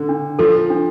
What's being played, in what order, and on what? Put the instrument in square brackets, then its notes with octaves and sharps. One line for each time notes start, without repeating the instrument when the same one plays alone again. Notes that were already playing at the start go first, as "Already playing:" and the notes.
Already playing: [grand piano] D3
[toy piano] D4
[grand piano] F3 [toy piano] A4
[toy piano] D4